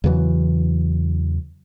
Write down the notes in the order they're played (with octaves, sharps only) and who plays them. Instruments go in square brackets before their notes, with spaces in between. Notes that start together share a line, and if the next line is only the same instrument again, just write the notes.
[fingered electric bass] E2 C#3 E3 F#3